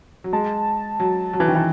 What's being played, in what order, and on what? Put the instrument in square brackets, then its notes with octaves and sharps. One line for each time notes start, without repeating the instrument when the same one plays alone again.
[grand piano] F#3
[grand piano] G#3 [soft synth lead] A5
[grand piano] F#3
F#3
E3
D#3
E3